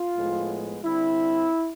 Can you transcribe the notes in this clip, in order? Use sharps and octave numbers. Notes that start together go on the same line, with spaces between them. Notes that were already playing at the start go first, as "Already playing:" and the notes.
Already playing: F4
A2 F3 G#3 B3
D3 G3 C4 E4